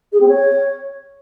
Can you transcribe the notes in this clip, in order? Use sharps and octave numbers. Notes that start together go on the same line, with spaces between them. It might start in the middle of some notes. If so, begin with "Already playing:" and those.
G#4
C4
C#5